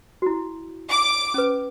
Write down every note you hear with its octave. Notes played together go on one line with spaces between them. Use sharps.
E4 F#4
D6
C#4 B4